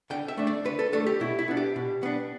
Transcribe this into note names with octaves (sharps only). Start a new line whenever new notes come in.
D3 G5
E5
A3 D4
D5
D3 B4
A4
A3 D4 A4
G4
B2 E4
E4
B3 D4
G4
B2
B3 D4